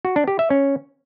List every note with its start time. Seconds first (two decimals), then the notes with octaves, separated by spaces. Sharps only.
0.05 F#4
0.16 D4
0.28 G4
0.39 E5
0.50 C#4